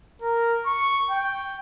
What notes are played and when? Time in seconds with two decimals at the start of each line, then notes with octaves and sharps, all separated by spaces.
0.22 A#4
0.66 C#6
1.11 G5